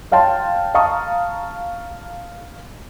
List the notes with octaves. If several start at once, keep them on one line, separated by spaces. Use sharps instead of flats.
C#5 F5 G5 A5 C6
F5 A5 A#5 C#6 D#6